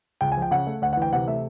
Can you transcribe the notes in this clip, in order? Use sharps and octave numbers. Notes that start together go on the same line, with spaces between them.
C#2 G5
G#5
F3
G5
C#3 F#5
A3
D2 F#5
F#5
E3 G5
C3 F#5
A3 E5